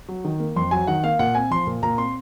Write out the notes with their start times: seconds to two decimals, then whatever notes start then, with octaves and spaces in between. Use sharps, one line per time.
0.09 F#3
0.25 D#3
0.40 A#3
0.56 F2 C6
0.71 F#3 G#5
0.88 D#3 F#5
1.04 A#3 F5
1.19 A#2 F#5
1.35 C4 G#5
1.51 F3 C6
1.67 A#2
1.83 A#2 A#5
1.98 C4 C6